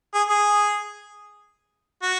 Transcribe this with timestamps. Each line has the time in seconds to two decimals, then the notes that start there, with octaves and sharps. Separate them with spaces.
0.14 G#4
0.29 G#4
2.02 F#4